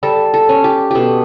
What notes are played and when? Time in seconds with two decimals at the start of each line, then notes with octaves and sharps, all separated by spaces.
0.03 G3 A4
0.34 A4
0.49 C#4
0.64 G4
0.91 B2 G4 A4